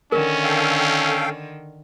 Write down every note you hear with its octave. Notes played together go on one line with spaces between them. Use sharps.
D3 D#3 C#4 A#4
A4 F5 G5